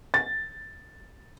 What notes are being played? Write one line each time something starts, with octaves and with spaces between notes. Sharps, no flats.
A6